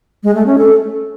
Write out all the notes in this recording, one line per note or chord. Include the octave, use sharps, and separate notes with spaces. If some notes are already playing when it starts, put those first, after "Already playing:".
G#3
A3
C#4
A4